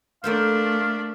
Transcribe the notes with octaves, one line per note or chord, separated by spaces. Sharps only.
A3 A#3 D4 A4 C5 F5